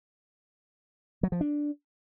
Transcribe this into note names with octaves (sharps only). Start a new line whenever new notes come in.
F#3
F3
D4